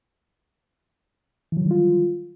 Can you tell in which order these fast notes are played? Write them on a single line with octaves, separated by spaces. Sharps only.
E3 F#3 D#3 G3 F4